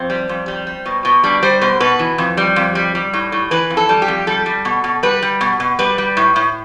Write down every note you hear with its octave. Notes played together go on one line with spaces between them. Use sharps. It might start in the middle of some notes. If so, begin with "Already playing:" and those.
Already playing: F2 C4
G3
F2
G3
G3
B2
B2
G3 D4
G3 C5
B2 C5
B2 B4
E3
F2
G3
F2
G3
G3
A2
A2
E3 B4
F2
A4
G3
G4
F2
G3 A4
G3
B2
B2
G3 B4
G3
B2
B2
G3 B4
G3
A2
A2